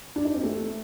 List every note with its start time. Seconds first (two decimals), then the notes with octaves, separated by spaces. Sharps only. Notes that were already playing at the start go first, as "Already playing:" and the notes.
0.16 D4
0.25 D#4
0.34 C4
0.43 A3